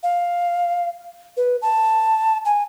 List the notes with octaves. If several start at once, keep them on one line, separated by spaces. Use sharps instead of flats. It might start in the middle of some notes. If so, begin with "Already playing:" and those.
F5
B4
A5
G#5